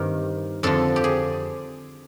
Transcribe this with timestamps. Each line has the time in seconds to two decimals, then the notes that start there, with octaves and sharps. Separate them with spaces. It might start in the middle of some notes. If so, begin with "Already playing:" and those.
Already playing: G2 D#3 C4 A#4
0.63 F2 D3 F3 A4
0.96 G4
1.04 G#4